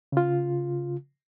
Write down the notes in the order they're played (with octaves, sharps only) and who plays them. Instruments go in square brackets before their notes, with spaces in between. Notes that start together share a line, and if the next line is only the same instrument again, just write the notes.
[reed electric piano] C#3 F4